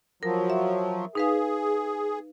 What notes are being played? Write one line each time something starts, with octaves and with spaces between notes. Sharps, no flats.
F3 F#3 A#4
E5
D#4 G#4 B4 F5